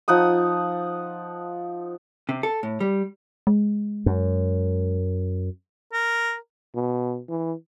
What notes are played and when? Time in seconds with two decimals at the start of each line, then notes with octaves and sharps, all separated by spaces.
0.08 F3 D#4 F#5 D#6
2.29 C3
2.43 A4
2.63 A2
2.80 G3
3.47 G#3
4.06 F#2
5.93 A#4
6.75 B2
7.29 E3